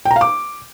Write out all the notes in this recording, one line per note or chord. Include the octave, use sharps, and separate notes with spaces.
G5
A#5
F5
D6